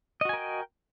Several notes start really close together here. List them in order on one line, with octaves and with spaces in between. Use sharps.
D#5 F#4 G#5 A#4 G5